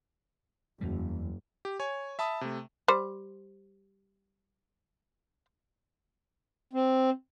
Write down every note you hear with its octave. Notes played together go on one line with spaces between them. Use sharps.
F#1 E2 G3
G4
C#5 G#5
E5 A5 B5 D#6
C3 A3
G3 C5
C4